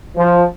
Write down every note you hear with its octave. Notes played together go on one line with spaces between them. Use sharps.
F3